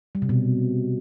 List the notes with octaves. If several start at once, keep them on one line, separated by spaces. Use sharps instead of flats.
G3
C3
B2